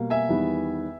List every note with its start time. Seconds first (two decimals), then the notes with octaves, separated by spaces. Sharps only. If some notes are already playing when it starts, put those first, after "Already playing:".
Already playing: B2 G3 A#3
0.10 E5 G#5
0.29 E2 D#3 G3 B3